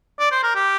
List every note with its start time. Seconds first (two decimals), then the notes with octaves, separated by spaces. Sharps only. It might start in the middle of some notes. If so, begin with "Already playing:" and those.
0.20 D5
0.32 C5
0.43 A#4
0.55 G4